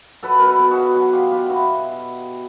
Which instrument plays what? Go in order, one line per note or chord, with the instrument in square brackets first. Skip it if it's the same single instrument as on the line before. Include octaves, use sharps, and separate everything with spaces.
[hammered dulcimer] F#3 A4 B4
B2 A#4
A4 B4
B2
F#4 G#4
F#3
F#3 F#4 G#4
F#3 F4 G4
B2 F4 G4
B2 E4 F#4